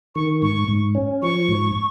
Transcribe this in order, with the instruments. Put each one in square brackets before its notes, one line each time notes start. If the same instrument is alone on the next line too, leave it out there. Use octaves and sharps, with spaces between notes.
[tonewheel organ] D#3 [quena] C#6
[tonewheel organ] G#2 [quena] C#6
[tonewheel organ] G#2
C#4
[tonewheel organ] F3 [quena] C#6
[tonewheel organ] G#2